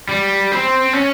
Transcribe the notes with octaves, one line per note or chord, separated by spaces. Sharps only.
G3
C4
C#4